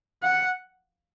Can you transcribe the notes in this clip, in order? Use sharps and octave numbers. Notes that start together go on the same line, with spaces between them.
F#5